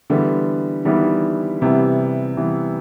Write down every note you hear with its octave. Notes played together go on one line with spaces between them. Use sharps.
D3 E3 G3 B3 E4
D#3 E3 G3 B3 E4
C3 E3 G3 B3 E4
E3 G3 B3 E4